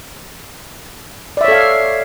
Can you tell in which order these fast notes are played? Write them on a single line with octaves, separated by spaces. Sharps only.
D5 E5 C#5 A4 F5